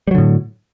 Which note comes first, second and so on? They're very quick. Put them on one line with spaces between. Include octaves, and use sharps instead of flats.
G3 F#3 D3 A2